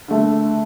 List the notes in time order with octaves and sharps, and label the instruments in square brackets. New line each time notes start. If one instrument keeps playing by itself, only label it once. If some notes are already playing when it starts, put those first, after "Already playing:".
[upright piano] D3 A3